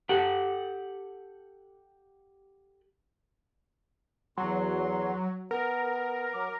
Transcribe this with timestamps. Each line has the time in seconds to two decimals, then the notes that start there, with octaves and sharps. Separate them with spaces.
0.09 G4 A4 F#5
4.38 E2 F#3 C6
5.51 B3 A#4
6.34 F#3 D6